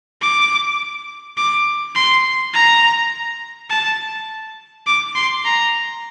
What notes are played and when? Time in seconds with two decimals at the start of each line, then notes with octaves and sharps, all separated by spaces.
0.21 D6
1.37 D6
1.95 C6
2.53 A#5
3.70 A5
4.86 D6
5.15 C6
5.45 A#5